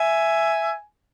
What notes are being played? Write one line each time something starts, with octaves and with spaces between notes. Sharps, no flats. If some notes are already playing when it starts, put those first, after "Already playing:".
Already playing: E5 G#5